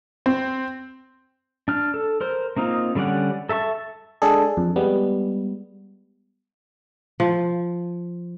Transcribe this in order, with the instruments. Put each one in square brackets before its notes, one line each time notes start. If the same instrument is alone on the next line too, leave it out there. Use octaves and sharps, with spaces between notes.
[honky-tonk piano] C4
[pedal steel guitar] D4 F6
A4
A#4 C5
A#3 C4 D#4 F4
D3 G3 C#4 D5 F#5
A4 E5 A5 C#6
[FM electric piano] G#3 D4 G#4 A4
F2
G3 G#3 B3
[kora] F3